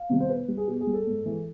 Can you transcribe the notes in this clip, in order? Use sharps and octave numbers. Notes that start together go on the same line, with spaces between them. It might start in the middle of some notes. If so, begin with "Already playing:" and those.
Already playing: F5
C3 D#3 G3
C5
B2 B4
G3
G#4
B2 G4
G#4
G3
A4
G#2
E3 G#3